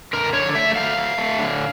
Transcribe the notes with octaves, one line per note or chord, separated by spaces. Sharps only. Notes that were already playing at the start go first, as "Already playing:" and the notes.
D3 A#4
D3 C#5
A3 E5
A3 F5
A3
A3
D3